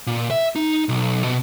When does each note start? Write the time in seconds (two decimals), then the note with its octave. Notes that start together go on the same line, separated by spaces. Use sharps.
0.07 A#2
0.31 E5
0.56 D#4
0.89 B1
1.24 B2